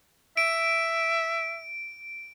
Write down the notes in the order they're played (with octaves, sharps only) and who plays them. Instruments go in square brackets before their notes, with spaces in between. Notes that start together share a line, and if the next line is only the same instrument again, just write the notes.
[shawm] E5 [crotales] D7